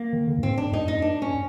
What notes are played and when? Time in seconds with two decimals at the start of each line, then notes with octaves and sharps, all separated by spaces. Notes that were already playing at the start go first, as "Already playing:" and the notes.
Already playing: A#3
0.13 D#3
0.28 D3
0.38 G2
0.43 G#2 C4
0.58 D4
0.72 G2 D#4
0.84 F#2 D#4
0.97 G2
1.02 D4
1.22 C#4